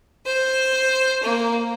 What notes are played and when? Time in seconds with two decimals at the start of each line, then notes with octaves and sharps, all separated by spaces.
0.25 C5
1.22 A#3